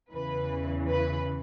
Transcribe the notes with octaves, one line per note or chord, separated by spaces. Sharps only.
E2 C#3 E3 B4
B4